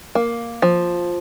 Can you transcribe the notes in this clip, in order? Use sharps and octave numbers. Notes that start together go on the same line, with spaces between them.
A#3
F3